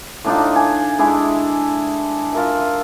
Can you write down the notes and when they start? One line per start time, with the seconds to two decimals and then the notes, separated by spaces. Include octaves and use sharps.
0.25 A2 D4 D#4 F4
0.56 G#5
0.99 G#3 D4 E4 G#4
2.33 F4 A#4 E5